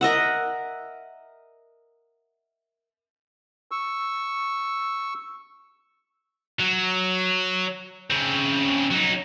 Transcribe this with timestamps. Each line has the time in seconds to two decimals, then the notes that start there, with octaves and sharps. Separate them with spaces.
0.01 A#4 D#5 E5 F#5
3.71 C#6 E6
6.60 F#3
8.10 C#3 C4
8.91 F#3 D#4